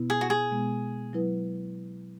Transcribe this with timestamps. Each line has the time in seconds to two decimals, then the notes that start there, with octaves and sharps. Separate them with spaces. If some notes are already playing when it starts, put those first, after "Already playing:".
Already playing: B2 B3 E4
0.10 G#4
0.21 F#4
0.30 G#4
0.51 B2 G#3 B3
1.13 F#3 E4 B4